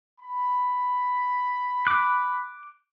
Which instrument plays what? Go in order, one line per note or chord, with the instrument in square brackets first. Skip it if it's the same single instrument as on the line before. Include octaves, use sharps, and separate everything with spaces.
[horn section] B5
[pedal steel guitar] D6 F#6